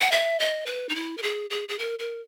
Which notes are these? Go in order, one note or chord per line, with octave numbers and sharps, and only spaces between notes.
F#5
E5
D#5
B4
D#4
E4
A#4
G#4
G#4
G#4
A#4
A#4